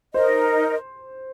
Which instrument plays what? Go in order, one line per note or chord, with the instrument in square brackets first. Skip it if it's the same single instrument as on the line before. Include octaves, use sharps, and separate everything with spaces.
[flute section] D#4 A#4 D#5 [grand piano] C5